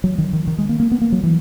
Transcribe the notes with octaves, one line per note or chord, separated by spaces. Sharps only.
F#3
D#3
D#3
D#3
G#3
A#3
A#3
B3
A#3
F#3
E3